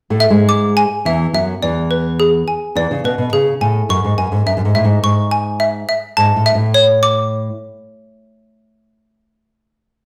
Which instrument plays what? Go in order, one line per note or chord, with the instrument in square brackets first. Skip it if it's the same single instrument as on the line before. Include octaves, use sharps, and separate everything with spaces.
[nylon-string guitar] A2 A3
[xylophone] E5
[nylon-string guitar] G#2 G#3
[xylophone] D6
G#5
[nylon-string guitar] E2 E3 [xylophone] E5
[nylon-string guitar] F#2 F#3 [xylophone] E5
[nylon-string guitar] E2 E3 [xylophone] D5
[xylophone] B4
G#4
G#5
[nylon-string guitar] E2 E3 [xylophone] D5
[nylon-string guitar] C#3
[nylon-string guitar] B2 [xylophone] B4
[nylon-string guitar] B2
[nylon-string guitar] C#3 [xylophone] G#4
[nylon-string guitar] A2 [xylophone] G#5
[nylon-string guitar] F#2 [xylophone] C#6
[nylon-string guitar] G#2
[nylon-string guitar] F#2 [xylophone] G#5
[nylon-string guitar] G#2
[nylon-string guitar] F#2 [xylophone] E5
[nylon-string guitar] F#2
G#2
[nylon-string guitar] A2 [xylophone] E5
[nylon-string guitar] G#2
[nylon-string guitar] G#2 [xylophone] C#6
[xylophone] G#5
E5
E5
[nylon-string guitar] G#2 [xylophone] A5
[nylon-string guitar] A2
[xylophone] E5
[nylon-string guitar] A2
[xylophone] C#5
D6